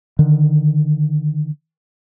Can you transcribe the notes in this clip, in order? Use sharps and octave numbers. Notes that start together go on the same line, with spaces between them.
D3 D#3